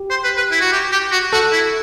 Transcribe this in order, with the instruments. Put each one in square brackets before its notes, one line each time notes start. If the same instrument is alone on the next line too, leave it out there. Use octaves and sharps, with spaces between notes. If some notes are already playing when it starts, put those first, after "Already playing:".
Already playing: [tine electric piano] G4
[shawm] C5
B4
B4
E4
F#4
G4
G4
F#4
[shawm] F#4 [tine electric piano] A4
[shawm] E4